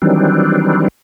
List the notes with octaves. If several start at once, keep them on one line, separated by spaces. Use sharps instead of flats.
D#3 E3 F#3 G3 C4 D4